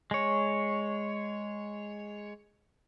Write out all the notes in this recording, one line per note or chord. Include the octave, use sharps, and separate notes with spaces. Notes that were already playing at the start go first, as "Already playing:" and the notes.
G#3 C#5